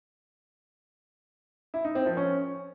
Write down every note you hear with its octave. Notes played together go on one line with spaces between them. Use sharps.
E4
D#4
C4
F3
C#4